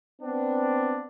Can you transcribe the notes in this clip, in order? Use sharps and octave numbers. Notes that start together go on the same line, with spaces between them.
B3 C4 D4